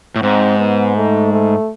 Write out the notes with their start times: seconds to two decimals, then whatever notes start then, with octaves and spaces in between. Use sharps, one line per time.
0.16 A2
0.23 G#2 C4
0.59 B3
0.96 A3
1.32 A3